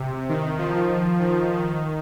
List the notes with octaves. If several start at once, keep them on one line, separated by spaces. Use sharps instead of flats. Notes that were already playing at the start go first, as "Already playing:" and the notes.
Already playing: C3
D#3
F3
D#3
D#3